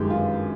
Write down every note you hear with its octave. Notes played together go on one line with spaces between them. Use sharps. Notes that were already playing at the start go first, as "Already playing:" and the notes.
Already playing: G1 F#2 D#3 G#3 G4
F4